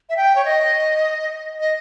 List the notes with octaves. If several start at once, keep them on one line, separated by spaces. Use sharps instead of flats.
E5
G5
C#5
D#5
D#5